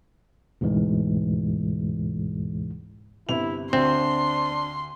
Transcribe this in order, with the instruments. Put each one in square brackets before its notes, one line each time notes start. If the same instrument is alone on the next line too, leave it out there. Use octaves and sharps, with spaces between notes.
[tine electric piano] D2 G#2 B2 E3 G#3
[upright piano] G1 C3 F7 [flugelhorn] E4
[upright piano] D2 [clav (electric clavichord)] C4 [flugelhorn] D4 [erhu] C6